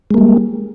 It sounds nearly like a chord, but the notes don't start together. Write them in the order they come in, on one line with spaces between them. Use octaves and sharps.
G#3 A#3 G3